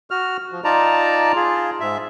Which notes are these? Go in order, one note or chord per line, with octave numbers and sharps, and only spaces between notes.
F#4 F6
F3
D#4 F4 D5 A5 A#5
F4 G#4
G#2 E5